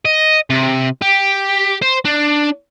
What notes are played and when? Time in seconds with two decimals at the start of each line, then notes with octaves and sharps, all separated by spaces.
0.05 D#5
0.50 C3
1.02 G4
1.82 C5
2.05 D4